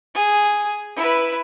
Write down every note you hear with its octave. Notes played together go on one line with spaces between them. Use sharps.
G#4
E4 B4